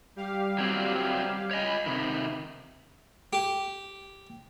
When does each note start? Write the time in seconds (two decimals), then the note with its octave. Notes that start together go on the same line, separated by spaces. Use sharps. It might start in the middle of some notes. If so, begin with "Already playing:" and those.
0.16 G3 G4 F5
0.58 F#3 C4
1.51 C#5 D#5 G#5 B5
1.86 C3 D#3
3.33 G4